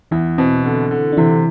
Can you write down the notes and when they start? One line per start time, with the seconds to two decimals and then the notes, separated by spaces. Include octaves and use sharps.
0.11 E2 E3 E4
0.38 B2 C4
0.65 D3
0.91 D3
1.13 D4
1.17 C3 E3 E4